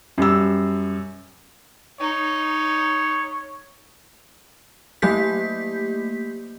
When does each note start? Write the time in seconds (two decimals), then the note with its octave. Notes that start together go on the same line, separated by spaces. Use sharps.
0.18 F#2 G3 E6
2.01 D#4 C#5
5.02 F#3 A3 A#3 G4 G6 B6